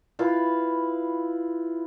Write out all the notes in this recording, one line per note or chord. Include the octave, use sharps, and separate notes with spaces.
E4 F4 B4